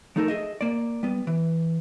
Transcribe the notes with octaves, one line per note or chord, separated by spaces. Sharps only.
F3 A3 D#4 A4 A#4
G#4 D#5 E5
A#3 D5
G3 B3
E3